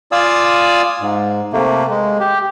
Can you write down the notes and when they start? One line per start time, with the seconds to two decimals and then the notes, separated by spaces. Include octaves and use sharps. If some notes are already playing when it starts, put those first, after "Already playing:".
0.12 F4 D5 F5 G#5 D#6 E6
1.01 G#2
1.53 C3 A3 A#3
1.90 G#3
2.20 G4